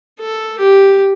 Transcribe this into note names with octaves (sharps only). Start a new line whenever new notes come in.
A4
G4